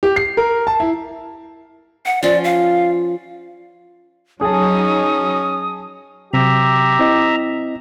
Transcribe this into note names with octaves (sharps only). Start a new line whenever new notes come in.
G4
C7
A#4
A5
E4
F#5
F3 C#4 F4 D5
F5
F#3 C#4 D#4 G#4 A5 D#6
C3 F#3 G4 E5 A#5
C4 E4 D#5